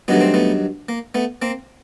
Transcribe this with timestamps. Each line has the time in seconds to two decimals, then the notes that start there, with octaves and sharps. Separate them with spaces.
0.08 G2 D#3 F#3 A3 B3
0.21 C4
0.34 A3 B3
0.89 A#3
1.15 A3 B3
1.42 A#3 C4